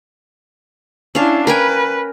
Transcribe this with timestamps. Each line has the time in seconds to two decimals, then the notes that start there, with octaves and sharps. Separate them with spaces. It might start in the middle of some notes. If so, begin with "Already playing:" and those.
1.15 C#4 D4 E4 F5
1.47 A#4 B4 G5 G#5